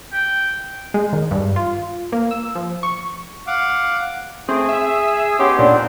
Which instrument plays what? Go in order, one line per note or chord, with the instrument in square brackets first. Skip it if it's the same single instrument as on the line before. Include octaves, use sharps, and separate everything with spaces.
[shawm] G5
[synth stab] G#3
D#3
G2
F4
A#3
E6
F3
C#6
[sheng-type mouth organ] F5 F#5 D6
[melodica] A3 [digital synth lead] C4 [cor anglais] G#4
[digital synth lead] E5 [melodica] D#6 E6
[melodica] B3 D#4 C6 [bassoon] C#4 [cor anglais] G4
[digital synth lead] A#2 [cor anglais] C4 [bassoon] D4